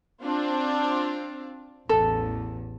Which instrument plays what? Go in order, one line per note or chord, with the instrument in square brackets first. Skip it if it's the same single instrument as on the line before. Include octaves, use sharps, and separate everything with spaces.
[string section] C4 D4 F4
[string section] A1 E2 [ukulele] A4